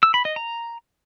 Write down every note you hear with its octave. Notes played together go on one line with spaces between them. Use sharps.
E6
B5
D#5
A#5